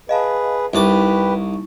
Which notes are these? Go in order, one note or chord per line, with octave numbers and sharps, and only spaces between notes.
G#4 B4 D#5 F5 A5
C2 D#4 E4 G4 B4 C#6 D6